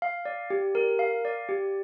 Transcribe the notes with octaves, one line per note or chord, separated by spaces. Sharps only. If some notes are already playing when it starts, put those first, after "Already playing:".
F5
D5
G4
A#4
F5
D5
G4